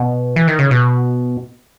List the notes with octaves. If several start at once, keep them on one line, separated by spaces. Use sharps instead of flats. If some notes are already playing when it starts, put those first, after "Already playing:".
Already playing: B2
E3
D#3
C#3
B2